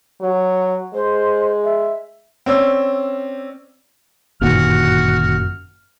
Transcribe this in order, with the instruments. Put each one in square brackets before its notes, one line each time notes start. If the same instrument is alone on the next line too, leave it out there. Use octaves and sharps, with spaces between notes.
[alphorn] F#3
[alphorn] G#3 [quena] C5
[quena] E5
[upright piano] C4 C#4 D5 E6
[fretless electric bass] G1 A#2 D#3 [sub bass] F#2 [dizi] F#4 [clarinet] F6